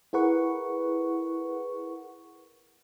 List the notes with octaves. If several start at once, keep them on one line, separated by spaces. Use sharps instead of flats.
E4 G#4 A#4 B4 F#5 C#6